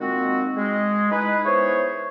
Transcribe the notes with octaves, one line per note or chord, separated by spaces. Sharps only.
A#2 D#3 G#3 C4 F#4
G#3
D#4 E4 G#4 B4
B3 E4 G#4 C5 C#5